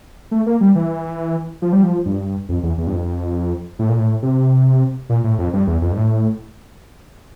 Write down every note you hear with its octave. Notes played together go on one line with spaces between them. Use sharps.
A3
A#3
G3
E3
F3
G3
F3
G2
F2
E2
E2
G2
F2
A2
A#2
A2
C3
A#2
A2
F2
G2
E2
F2
G2
A2